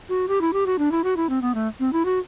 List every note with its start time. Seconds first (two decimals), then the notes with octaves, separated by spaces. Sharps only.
0.09 F#4
0.28 G4
0.41 E4
0.53 G4
0.66 F#4
0.78 D4
0.91 E4
1.04 F#4
1.16 E4
1.29 C4
1.42 B3
1.54 A3
1.80 C4
1.93 E4
2.05 F#4